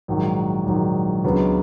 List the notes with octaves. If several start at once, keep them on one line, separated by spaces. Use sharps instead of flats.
A#1 G#2 D#3 F#3
A#1 G#2 D#3 F#3
C#2 C#3 F#3 B3 D4